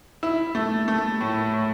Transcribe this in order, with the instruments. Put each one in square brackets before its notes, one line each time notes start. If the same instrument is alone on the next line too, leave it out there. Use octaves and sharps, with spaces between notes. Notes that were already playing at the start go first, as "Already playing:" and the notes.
[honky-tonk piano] E4
A3
A3
A2
A2